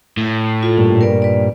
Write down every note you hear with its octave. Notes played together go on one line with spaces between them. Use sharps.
A2
F4 A4
G2 A#2
A#4 B4 D5
B4 D5